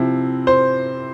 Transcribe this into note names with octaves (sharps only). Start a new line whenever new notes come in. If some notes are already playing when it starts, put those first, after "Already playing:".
Already playing: C3 F3 C4 E4
C5